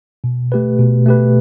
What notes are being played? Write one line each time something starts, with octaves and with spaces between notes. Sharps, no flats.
B2
A3 G4 B4
B2
A3 G4 B4